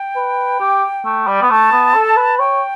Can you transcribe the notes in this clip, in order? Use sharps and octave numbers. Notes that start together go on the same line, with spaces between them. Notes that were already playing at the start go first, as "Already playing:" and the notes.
Already playing: G5
B4
G4
A3
G3
B3
A3 A5
B3
A4
B4
C#5 G5